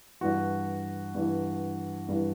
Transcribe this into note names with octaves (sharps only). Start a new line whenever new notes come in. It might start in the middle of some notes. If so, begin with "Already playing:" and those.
G2 E3 F#4
G2 E3
G2 E3